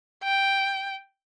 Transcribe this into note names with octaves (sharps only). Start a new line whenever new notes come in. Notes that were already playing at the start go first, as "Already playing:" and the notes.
G5